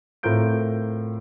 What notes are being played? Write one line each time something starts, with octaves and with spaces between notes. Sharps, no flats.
A2 C4 F4 A#4 G6 D7